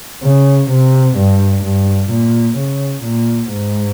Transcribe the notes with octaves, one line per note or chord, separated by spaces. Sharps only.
C#3
C3
G2
G2
A#2
C#3
A#2
G#2